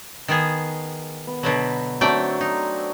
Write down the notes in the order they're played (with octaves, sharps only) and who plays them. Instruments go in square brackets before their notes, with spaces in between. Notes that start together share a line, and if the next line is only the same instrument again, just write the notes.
[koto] D#3 B3 G#4
[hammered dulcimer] B3
[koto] B2 D3 F#3 [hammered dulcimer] B5
[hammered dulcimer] F#3 C4 D4 [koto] A3 D5 G5
[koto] D#4